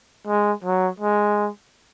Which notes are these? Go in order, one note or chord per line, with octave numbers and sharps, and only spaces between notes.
G#3
F#3
G#3